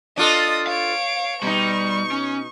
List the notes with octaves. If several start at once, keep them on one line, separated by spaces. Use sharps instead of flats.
D4 F4 A4 D#5 D#6
C#5 F5 D7
B2 G3 D#4 C#6
C#4